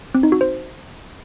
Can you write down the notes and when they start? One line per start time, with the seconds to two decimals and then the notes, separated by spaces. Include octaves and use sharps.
0.15 C4
0.23 D#4
0.32 F#4
0.41 C5